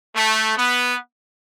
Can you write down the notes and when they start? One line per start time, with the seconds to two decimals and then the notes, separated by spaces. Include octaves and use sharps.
0.16 A3
0.57 B3